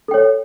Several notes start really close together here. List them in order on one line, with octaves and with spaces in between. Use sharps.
A4 G5 C#5